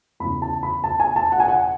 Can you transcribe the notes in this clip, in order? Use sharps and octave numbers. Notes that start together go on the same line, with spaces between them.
E2 C#3 E3 B5
A5
B5
A5
G#5
A5
F#5
G#5
F#5